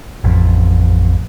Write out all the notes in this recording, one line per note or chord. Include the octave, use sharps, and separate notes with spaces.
A1 F2